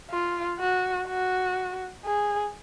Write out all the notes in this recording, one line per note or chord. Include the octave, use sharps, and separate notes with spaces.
F4
F#4
F#4
G#4